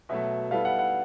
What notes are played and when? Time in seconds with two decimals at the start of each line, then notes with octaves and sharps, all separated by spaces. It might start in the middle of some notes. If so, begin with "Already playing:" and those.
0.09 B2 F#3 A3 E5
0.51 G3 B3 E4 A4 F5
0.65 F#5
0.79 F#5